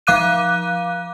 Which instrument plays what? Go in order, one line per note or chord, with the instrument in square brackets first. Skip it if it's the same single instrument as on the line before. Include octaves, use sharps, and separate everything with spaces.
[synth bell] F3 F5 D6 F#6 D#7